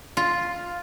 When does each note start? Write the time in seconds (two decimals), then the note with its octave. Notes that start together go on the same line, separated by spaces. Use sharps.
0.17 F4